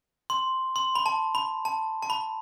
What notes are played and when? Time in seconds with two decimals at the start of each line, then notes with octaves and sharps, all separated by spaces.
0.30 C6
0.76 C6
0.95 B5
1.06 A5
1.35 B5
1.65 A5
2.03 A5
2.10 B5